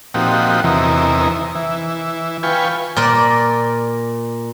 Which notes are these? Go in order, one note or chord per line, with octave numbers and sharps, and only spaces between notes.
A#2 F3 C4 D#4 F#4 G4
E2 C3 E3 D#4 A#4
E3
F4 B4 G5 G#5 C#6
A#2 A#4 D5